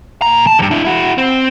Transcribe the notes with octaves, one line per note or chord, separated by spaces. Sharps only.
A#2 A#5
A5
G2 D3
D4 E4
E4 F#4
C4